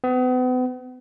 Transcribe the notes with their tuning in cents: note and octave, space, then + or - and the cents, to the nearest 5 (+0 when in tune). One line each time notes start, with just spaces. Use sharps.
B3 +40